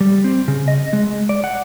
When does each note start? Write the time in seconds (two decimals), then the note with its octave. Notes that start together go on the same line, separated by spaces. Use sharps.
0.01 G3
0.24 C4
0.48 C#3
0.68 D#5
0.93 G#3
1.29 D5
1.44 F#5